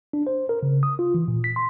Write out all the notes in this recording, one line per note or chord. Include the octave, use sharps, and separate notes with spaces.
D4
C5
A#4
C#3
D#6
F4
E3
A#2
B6
C6